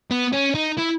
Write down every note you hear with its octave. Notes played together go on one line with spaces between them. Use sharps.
B3
C#4
D#4
E4